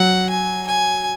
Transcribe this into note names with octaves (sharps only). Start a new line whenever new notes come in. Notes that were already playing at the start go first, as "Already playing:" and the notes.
Already playing: F#3 F#5
G#5
G#5